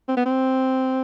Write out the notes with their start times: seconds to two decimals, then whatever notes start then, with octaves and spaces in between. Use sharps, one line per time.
0.08 C4
0.17 B3
0.26 C4